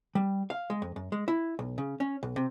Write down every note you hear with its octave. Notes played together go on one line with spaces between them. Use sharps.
G3
F5
G#3
F2
F#2
G#3
E4
B1
C#3
C#4
B1
C3